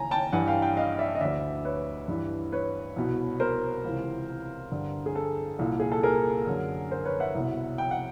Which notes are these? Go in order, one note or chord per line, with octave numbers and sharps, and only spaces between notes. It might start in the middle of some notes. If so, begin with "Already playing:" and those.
Already playing: D#2 C#3 E3 G#5 A#5
G5 A5
G2 E3 F#5 G#5
F5 G5
F5 G5
D#5 F5
D5 E5
D#5
D2 D3 D5 E5
B4 C#5
G2 E3
B4 C#5
C2 B2
A#4 C5
C#2 C3 E3
G2 D3
G#4
A4
C2 A#2
G#4
A4
G#4 A#4
F#2 D3
A#4 C5
B4 C#5
E5 F#5
C2 B2
G5
F#5